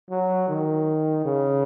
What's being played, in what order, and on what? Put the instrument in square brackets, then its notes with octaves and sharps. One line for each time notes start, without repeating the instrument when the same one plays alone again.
[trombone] F#3
D#3
C#3